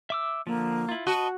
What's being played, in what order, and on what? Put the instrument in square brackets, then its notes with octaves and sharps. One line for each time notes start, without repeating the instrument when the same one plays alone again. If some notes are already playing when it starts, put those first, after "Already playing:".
[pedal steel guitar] E5 D6 E6
[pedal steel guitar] D3 F3 [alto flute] A#3
[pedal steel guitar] E4 F4
[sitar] F#4 [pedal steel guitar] B4 D#5 [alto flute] A5